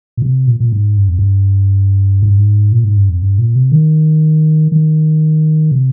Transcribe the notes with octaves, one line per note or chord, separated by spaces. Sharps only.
A#2
C3
A#2
A#2
G#2
G2
F2
G2
G#2
G2
G#2
A#2
G#2
G2
F2
G2
A#2
C3
D#3
D#3
C3